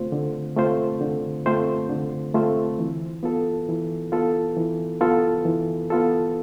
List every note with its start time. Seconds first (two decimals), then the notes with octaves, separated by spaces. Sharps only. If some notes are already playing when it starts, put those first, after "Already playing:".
Already playing: D3 A3 C4 F4 C5
0.12 D3
0.57 A3 C4 F4 C5
1.01 D3
1.46 A3 C4 F4 C5
1.90 D3
2.34 A3 C4 F4 C5
2.79 E3
3.23 B3 F4 A4
3.68 E3
4.12 B3 F4 A4
4.57 E3
5.01 B3 F4 A4
5.45 E3
5.90 B3 F4 A4